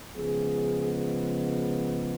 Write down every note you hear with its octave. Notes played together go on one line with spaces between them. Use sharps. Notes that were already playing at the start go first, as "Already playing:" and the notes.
C#3 F3 G#3 B3 G#4